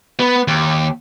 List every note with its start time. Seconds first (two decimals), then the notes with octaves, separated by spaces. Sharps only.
0.20 B3
0.48 D#2